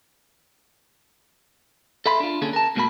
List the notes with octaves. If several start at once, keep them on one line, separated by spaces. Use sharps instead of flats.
A4 E5 B5 C6
D4 F4
D3 A#3 C#4 G#4 A4
A#4 A5
G#2 B2 A3 A#3 F#4 B5